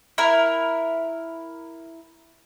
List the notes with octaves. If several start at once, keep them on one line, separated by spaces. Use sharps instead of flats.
E4 A#4